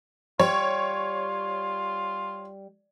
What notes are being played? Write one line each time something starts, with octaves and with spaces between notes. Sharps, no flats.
G3 F4 C#5